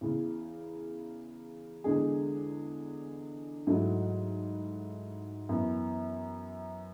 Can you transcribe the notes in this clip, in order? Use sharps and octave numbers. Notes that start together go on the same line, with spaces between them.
E2 C#3 E3
E2 D3 G#3 D4 G#4
G#2 F#3 A3 E4 A4
F#2 E3 B3